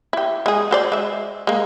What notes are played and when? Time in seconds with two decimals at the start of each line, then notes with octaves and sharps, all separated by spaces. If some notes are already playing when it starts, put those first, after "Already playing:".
0.13 E4 G4
0.46 G#3 G#4
0.71 F#4 C5 D5
0.92 G#3 E5
1.47 G#3 A#3